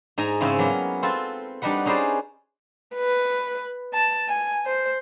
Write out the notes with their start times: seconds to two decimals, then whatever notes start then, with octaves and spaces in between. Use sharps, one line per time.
0.18 G#2 D#4 G#5 A#5
0.40 G#2 C#3 C4 C#4 E4
0.59 F#3 A#3 B3
1.03 C4 F4 A4 B4
1.62 G3 D4 D#4 B4 F#5
1.85 C#4 D#4 G#4 B4 C5 D5
2.95 B4
3.93 A5
4.29 G#5
4.66 C5